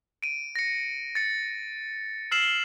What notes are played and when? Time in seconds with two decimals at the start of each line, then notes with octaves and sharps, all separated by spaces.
0.23 D7 D#7
0.56 A#6 C#7
1.15 A6 C#7
2.31 E6 F6 C7 E7 F#7